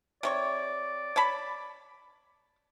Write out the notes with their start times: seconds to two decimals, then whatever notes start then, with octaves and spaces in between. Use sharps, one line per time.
0.23 C3 C#5 D5 C#6
1.16 C#5 A5 B5